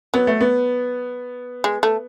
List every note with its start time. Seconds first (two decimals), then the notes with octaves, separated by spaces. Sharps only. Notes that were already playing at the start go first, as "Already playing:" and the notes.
0.14 F#3 B3
0.27 A3
0.40 B3
1.64 G#3
1.83 A3